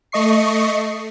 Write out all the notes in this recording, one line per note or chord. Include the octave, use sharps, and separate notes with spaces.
A3 D#5 C#6 C7